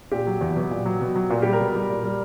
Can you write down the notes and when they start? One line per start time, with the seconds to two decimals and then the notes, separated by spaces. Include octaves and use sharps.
0.11 A#2 G4
0.27 F#3
0.41 E2
0.56 B2 F#3
0.71 A#2
0.86 F#3
1.01 B2
1.15 F#3
1.30 A#2 A#4
1.42 G3 G4
1.53 A#4
1.60 B2
1.75 G3
1.90 A#2
2.04 G3